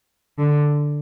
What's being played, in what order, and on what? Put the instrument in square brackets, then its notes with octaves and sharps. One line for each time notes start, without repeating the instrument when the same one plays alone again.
[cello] D3